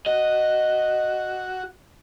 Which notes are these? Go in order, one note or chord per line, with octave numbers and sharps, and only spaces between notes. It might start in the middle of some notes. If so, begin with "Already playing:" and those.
F#4 D#5